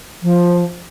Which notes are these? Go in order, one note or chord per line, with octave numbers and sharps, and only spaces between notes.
F3